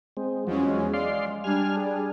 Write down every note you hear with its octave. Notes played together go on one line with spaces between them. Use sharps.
G#3 C4
E2 F3 F#3 G#3 C#4
G#3 D5 F5 C6
G3 D4 G#5 F6
G#4